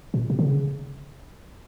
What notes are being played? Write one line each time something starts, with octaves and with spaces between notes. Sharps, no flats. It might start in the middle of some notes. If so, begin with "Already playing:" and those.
A#2
B2
D3
C#3